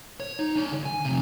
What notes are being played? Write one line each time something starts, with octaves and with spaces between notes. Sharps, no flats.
C#5
D#4
D4 C#5
D2
G#5
F2 C3